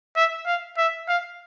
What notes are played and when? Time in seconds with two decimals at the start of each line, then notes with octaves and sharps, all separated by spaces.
0.16 E5
0.46 F5
0.77 E5
1.08 F5